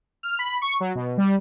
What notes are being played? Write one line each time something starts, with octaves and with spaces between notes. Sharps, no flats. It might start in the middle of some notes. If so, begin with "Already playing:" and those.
F6
B5
C#6
F#3
B2
G3